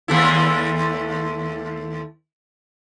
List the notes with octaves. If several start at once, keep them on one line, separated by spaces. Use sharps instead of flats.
D#2 A3 E4